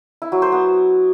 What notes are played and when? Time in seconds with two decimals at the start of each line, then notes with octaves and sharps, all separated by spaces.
0.22 E4
0.32 F#3
0.42 C5
0.52 B3